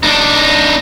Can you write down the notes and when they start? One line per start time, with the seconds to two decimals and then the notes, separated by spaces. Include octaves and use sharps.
0.03 D4 D#4